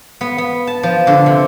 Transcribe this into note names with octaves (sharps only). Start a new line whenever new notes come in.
B3
B3
A5
F3
D3
C3